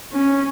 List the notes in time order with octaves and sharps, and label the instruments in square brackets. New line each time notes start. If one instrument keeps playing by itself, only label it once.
[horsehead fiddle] C#4